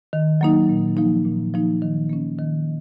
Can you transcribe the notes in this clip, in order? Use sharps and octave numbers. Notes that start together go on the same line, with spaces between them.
D#3
F#3 A#3 D#4
A#2
F3 A#3 D#4
A#2
F3 A#3 D#4
D#3
A#3 C#4
D#3